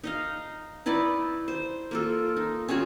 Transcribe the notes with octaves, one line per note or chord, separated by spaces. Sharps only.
D#4 D#5 F5
D#4 E4 B4 D5
C5
A#3 F4 A4
D#4
C#4 F4 F#4 G#4